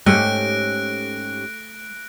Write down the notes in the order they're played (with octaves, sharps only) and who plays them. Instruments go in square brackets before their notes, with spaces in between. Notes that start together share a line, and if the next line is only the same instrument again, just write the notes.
[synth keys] G#2 C#4 G4 [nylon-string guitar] A3 [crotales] F#6 A#6 D7